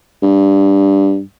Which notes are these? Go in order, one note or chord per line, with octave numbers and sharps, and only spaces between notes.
G2